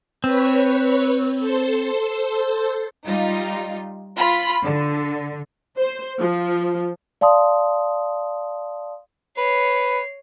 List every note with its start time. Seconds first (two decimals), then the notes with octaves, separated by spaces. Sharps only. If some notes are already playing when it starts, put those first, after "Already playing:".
0.24 C4 B4 C#5
1.39 A4 C5
3.06 G3 D#4 F4
4.17 F4 B5
4.64 D3
5.78 C5
6.19 F3
7.21 D5 F5 A5 C6 D#6
9.38 B4 C#5 C7